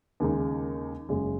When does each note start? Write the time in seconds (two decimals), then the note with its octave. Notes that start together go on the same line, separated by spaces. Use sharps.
0.20 D#2 C#3 G#3 D#4
1.09 F#1 F#2 C#3 G#3 C#4